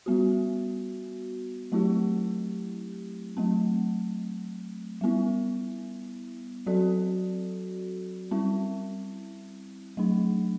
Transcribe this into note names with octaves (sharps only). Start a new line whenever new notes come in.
G3 B3 F#4
F#3 A3 C4 E4 G4
F#3 A3 C4
G3 B3 E4
F#3 C4 F#4 A4 D5
G3 C4 E4
F#3 A3 D4